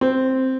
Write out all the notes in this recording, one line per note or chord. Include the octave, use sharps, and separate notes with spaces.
C4